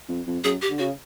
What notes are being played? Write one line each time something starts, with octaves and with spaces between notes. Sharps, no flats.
F2
F2
F#2 G#4
G4
D3
C#3 F#4